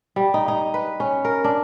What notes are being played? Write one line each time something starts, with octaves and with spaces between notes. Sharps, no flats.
G3
D#4
D#4
B4
C#4
A#4
D4